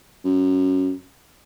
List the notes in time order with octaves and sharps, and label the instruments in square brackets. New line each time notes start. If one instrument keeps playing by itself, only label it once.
[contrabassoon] F#2